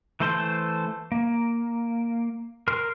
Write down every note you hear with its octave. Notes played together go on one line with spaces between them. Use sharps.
E3 A3 A4 C5 C6
A#3
A#4 C6 F6